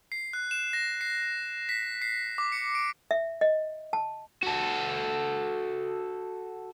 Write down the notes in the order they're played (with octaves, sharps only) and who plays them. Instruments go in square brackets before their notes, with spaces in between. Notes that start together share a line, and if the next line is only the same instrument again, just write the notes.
[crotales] C7
F#6
E7
A#6
C7
B6
C7
D6
C#7
D7
[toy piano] E5
D#5
A5
[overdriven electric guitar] F#4 A4